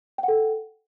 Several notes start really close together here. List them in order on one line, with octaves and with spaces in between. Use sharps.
G5 F#5 A4